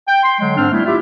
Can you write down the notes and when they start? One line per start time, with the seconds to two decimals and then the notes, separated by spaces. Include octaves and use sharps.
0.08 G5
0.23 C6
0.40 D3 F#3 G#3
0.56 G#2 C4 D4 F6
0.71 G3 A3 B3 E4
0.85 E4 F4 G4 E5